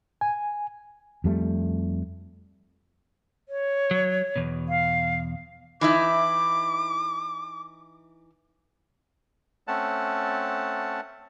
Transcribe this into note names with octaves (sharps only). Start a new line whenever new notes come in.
G#5
F2 G3 A3
C#5
F#3
E2 B2
F5
E3 D#4 E4 D6
A3 C4 C#4 F#5 A5